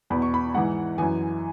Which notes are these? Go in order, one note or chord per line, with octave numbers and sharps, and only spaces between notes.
E2 B2 B5
C#6
B5
G#2 E3 F#5
F#2 E3 G#5